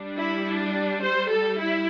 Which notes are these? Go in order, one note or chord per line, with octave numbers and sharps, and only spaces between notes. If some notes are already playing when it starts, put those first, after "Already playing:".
Already playing: G3 D4
E4
D4
C5
A4
E4